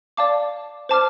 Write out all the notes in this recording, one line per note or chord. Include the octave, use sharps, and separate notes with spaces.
D5 F5 A5 D6
C5 A5 D6 F6